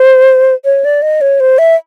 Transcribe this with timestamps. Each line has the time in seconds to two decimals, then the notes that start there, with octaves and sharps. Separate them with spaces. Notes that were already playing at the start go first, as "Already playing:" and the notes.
Already playing: C5
0.65 C#5
0.85 D5
1.02 D#5
1.21 C#5
1.40 C5
1.58 E5